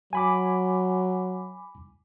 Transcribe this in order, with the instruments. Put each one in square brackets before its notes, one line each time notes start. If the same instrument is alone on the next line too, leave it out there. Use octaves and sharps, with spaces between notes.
[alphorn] F#3 [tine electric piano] G#5 B5 D6